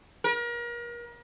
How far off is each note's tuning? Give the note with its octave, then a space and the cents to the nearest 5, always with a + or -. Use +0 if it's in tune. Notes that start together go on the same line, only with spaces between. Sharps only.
A#4 +35